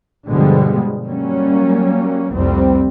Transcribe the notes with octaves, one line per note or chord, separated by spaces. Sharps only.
G2 B2 D3 F3 G3 G#3
F#3 G3 A#3 C#4
F1 C2 F2 G3 C4